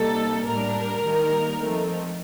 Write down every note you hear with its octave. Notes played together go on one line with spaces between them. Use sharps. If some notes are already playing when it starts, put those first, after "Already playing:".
Already playing: C3 G3 A#3 D#4 A4
A2 G3 D4 A#4
D#3 G3 A#3 D#4
F3 A3 C4 D#4